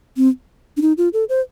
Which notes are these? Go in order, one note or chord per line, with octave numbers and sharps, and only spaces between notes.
C4
D4
D#4
F4
A4
C5